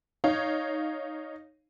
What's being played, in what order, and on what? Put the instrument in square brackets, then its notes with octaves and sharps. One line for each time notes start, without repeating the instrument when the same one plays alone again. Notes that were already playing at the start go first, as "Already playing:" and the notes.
[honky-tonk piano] D#4 C#5 F5